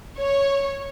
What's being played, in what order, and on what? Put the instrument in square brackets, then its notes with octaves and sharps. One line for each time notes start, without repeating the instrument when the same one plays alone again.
[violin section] C#5